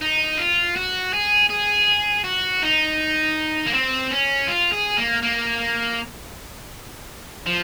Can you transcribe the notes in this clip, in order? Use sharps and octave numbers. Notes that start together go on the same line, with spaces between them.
D#4
F4
F#4
G#4
G#4
F#4
D#4
A#3
C4
C#4
F4
G#4
A#3
A#3
F3